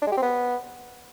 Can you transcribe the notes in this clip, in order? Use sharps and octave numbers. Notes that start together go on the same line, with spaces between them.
D4
G#3
G4
C4
B3